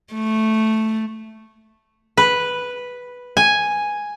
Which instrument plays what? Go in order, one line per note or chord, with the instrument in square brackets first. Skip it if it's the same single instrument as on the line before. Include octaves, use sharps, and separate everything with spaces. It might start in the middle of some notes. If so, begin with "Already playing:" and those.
[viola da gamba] A3
[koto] B4
G#5